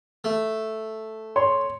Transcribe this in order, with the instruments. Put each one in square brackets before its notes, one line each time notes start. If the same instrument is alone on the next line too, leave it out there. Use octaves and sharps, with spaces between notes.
[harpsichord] A3
[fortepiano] C#5 C6